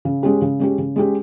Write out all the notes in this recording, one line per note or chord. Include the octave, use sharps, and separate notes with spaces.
C#3
G#3 C#4 G4
C#3
G#3 C#4 G4
C#3
G#3 C#4 G4